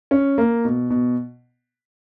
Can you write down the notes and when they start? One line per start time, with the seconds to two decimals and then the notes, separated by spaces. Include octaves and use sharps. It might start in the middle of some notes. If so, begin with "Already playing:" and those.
0.11 C#4
0.38 A#3
0.65 B2
0.90 B2